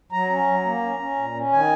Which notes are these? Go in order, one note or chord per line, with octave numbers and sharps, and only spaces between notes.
F#3 A#5
C#4
F#3
A#3
C#4
C#4
A#2
C#4
D#3 G#5